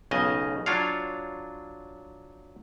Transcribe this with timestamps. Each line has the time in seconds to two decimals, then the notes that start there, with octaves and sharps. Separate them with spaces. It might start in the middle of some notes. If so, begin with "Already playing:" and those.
0.11 B1 C#3 D#5
0.66 F#3 D4 F4 C#5 F5